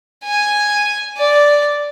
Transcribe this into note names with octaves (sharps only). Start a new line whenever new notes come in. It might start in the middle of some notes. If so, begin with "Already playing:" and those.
G#5
D5